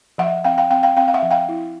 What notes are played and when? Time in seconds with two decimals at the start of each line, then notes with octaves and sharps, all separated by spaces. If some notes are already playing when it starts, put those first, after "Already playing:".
0.18 F3 E5 F#5
0.44 C4 F5 G5
0.58 F5 G5
0.70 C4 F5 G5
0.83 F5 G5
0.97 C4 F5 G5
1.08 F5
1.14 E5 F#5
1.22 F3
1.31 F5 G5
1.49 E4